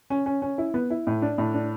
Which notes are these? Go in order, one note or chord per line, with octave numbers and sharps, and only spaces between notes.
C#4
C#4
C#4
E4
B3
E4
A2
D4
A2
D4